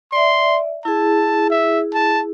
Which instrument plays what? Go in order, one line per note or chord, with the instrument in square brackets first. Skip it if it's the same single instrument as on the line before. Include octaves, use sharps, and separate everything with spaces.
[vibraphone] D5 E5 [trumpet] C6
[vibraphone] E4 G#4 [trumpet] A5
[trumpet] E5
A5